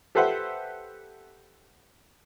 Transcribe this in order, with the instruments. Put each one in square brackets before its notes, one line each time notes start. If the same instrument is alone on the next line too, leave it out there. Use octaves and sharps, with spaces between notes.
[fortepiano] G4 A4 B4 C5 E5 F#5